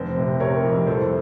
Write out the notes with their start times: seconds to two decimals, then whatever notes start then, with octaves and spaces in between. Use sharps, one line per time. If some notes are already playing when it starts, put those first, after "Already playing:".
Already playing: F1 C4 C5
0.17 C3
0.40 C3 A#4 C#5
0.64 F2
0.87 C2 A4 C5